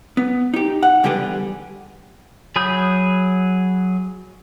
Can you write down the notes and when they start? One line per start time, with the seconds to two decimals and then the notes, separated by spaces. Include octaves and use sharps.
0.17 B3
0.54 D#4 G4
0.83 F#5
1.03 E2 D3 G3 G4 G#4 B4
2.56 F#3 G#4 B5 D#6 G6